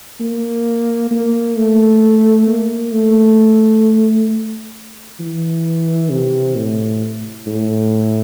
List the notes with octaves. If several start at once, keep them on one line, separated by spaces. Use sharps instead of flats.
A#3
A#3
A3
A#3
A3
E3
C3
A2
A2